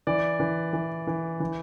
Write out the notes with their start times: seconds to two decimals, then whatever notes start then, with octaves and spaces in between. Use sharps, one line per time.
0.07 E3 D5
0.40 E3
0.73 E3
1.07 E3
1.40 E3